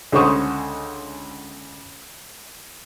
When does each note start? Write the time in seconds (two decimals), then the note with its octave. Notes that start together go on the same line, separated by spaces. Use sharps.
0.12 C#2 D3 G#3 C5 C#6 D#6